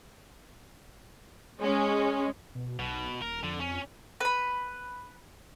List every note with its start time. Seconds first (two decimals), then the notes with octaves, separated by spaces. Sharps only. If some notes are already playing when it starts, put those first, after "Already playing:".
1.61 G#3 C#4
2.55 B2
2.79 B1 B2
3.22 D#1 A#4
3.43 F2 D3
3.60 C#4
4.20 B4 B5